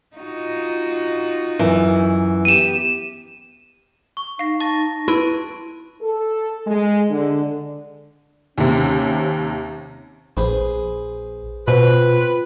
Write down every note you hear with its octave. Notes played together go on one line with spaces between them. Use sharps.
D#4 F4 F#4
F#2 E3
B3 G4 D#7 E7
C#6
D#4 F5 A#6
A5 C#6 A6 A#6
E4 B4 C6 D7 D#7
A4
G#3
D3
D#2 C3 C#4
A#1 G#4 B4 C5
B2 C4 F4 B4